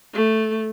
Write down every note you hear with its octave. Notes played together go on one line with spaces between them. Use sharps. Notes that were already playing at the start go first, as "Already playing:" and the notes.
A3